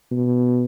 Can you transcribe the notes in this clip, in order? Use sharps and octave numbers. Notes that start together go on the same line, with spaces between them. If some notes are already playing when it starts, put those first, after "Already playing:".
B2